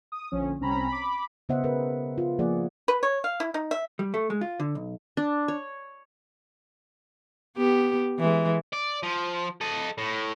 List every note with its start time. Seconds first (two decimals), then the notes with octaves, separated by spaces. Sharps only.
0.12 D#6
0.32 A#1 D3 F3 C#4
0.60 C2 C4 C#4 A#5 B5
0.88 B5 D6
1.49 C#3 B3 C5 D#5 E5 F#5
1.64 G#4 A#4 B4
2.18 F4
2.39 F3 A#3 G#4 D5 F#5
2.88 B4
3.03 C#5
3.24 F5
3.40 E4
3.54 D#4
3.71 E5
3.99 G3
4.14 A3
4.30 G#3
4.41 F4
4.60 D3
4.75 B1
5.17 D4
5.48 C#5
7.57 B3 G4
8.19 E3 G#3
8.73 D5
9.03 F3
9.61 A4 D#5
9.98 A2